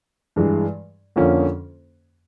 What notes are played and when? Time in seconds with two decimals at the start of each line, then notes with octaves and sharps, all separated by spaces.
0.36 G2 E3 G#3
1.16 F2 D3 F3 A#3 C#4